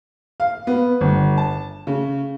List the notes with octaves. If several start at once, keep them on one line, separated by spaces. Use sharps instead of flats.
F5
B3
G1
A5
C#3